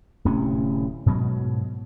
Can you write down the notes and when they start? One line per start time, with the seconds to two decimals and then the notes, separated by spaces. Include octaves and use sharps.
0.25 D1 A2 C3 C#4
1.06 G#2 B2 F#3